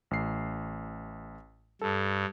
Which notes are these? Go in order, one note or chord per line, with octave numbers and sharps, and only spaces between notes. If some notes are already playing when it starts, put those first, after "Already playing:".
A1 A3 C7
G2 A4